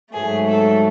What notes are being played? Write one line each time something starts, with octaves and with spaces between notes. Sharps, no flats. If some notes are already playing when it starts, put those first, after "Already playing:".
G#2 F#3 A3 G#4
A4